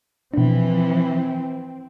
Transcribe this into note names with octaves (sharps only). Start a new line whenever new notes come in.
B2 E3 F3 C4 D4